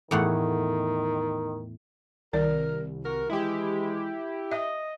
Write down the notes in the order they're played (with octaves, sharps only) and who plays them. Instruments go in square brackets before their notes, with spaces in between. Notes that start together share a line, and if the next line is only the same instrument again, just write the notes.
[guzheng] E2 A2 F#5 [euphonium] D#3
[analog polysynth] C2 [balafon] D#3 D5 [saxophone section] A#4
[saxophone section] F#4 A#4
[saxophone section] E3 G#3 [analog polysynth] E4 G4
[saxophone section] D#5 [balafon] E5